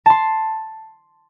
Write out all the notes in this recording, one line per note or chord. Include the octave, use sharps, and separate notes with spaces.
A5 C6